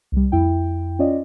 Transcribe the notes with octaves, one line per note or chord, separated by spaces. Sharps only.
C2 G3
F2 E4 G5
C#4 F4 D5 D#5